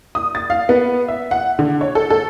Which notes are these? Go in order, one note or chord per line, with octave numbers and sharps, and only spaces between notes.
D#6
A6
F5
B3
E5
F#5
D3
C#5
A4
A4